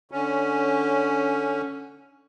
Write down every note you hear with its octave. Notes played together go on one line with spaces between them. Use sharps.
D3 C#4